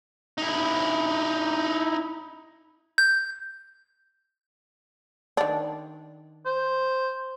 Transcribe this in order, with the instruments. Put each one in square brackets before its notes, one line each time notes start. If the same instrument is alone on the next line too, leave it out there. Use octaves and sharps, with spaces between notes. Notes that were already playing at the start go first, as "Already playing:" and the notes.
[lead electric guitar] D#4 E4
[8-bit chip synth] G6
[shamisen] D#3 D4
[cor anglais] C5